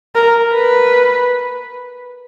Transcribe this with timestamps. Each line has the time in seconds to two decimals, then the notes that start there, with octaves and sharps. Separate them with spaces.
0.15 A#4
0.54 B4